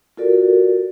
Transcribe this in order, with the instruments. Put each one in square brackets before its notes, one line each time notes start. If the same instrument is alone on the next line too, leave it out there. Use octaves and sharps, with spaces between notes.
[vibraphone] F4 F#4 A4 A#4 D5